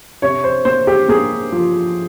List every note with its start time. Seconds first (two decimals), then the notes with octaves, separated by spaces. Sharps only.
0.22 C3 C#5
0.44 C5
0.65 A#3 C5
0.87 G4
1.08 A#3 G#4
1.52 F3